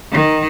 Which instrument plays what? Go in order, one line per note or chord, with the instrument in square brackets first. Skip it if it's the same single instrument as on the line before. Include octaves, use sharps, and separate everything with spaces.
[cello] D#3